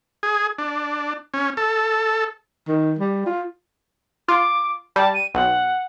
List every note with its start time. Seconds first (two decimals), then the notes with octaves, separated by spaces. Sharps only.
0.23 G#4
0.58 D4
1.34 C#4
1.57 A4
2.68 D#3
2.99 G3
3.26 F4
4.28 F4 D6
4.96 G3 A5
5.14 D#7
5.34 B1 F#5